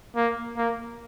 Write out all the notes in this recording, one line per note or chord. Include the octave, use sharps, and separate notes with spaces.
A#3
A#3